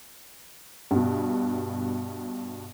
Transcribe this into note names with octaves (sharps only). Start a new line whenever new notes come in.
G2 B2